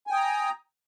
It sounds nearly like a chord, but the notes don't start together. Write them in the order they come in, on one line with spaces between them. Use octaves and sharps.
G#5 G5 D#6 A#5